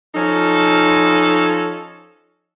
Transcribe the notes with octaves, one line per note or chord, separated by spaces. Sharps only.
F3 C#4 D#4 A4